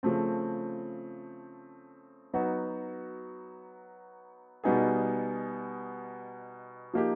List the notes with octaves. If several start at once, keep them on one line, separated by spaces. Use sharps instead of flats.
C#3 F3 A3 C4
F#3 B3 D#4 F#4
B2 G3 B3 D#4 G#4
F3 A#3 D#4 G4